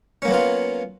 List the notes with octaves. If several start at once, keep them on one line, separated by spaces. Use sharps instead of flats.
F#3 A#3 B3 C#4 F4